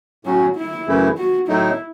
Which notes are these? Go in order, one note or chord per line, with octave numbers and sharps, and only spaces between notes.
A2 F#3 C#4 F#4
E4
F#2 C#3 E3 A3 E4
F#4
A2 F#3 A3 D#4 E4